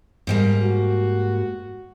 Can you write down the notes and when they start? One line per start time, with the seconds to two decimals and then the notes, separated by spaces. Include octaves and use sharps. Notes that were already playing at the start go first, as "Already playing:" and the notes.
0.27 G#2 G3 A#3
0.62 F#4